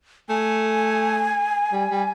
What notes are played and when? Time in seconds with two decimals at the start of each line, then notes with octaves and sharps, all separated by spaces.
0.29 A3 G#5
1.73 G3
1.90 G3